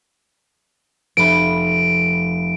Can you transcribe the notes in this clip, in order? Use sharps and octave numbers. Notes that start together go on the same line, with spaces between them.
F1 B5 D7